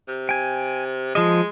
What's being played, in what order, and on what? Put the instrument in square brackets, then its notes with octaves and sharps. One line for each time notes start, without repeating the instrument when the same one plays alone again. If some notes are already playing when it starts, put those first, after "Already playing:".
[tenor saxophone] C3
[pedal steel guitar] G5 G#5
[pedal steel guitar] F3 D#5 [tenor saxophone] G#3